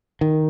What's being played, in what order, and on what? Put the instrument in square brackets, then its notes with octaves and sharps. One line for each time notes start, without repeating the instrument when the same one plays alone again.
[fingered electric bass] D#3